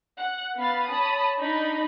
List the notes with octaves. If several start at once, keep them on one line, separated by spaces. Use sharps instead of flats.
F#5
B3 F5 B5 A6
C#5 A5 B5 D#6
D4 D#4 D#5 B5